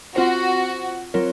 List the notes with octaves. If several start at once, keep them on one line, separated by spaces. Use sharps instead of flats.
C4 F4 F#4 C5
F#3 C4 F4 A#4 C#5